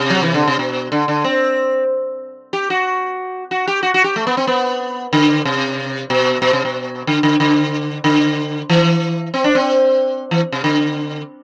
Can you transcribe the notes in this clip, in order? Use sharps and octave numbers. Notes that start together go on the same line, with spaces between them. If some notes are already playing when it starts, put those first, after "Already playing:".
Already playing: C3
F#3
E3
D3
C3
B2
D3
D3
C4
G4
F#4
F#4
G4
F#4
F#4
G4
A3
B3
C4
B3
D3
C3
B2
B2
C3
B2
D3
D3
D3
D3
E3
C4
D4
C4
E3
C3
D3